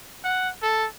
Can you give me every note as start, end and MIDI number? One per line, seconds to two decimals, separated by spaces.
0.24 0.49 78
0.62 0.86 69